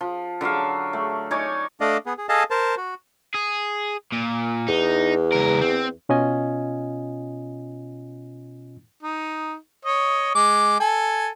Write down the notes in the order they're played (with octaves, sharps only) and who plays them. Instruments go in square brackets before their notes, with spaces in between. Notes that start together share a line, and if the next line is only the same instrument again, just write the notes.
[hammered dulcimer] F3
D3 F#3 E5 F5
A3
D#4 C#5 D5 G#5
[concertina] A3 D4 D5 D#5 F5
B3 G#4
G#4
G#4 A4 D#5 F5 G#5 A5
A#4 C5 A5
F#4
[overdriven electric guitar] G#4
A#2
[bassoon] E2 [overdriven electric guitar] D#4
[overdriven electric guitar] C#2 A#4
C4
[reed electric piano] B2 C#4 F4 D#5 G#5
[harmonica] D#4
C#5 D#5
G#3 D6
A4 G#5